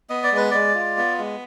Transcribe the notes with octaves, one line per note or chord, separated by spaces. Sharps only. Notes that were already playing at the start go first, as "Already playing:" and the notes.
B3 D#5
D5
G#3 B4
G#3 D5
F4
B3
G#3